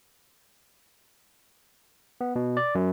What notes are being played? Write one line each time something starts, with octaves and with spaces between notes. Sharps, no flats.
B3
B2
D5
F#2